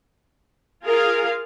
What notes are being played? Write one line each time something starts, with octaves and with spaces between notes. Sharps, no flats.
F4 G#4 A#4 F5